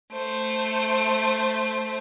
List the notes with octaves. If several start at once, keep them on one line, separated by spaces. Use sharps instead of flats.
A3 C5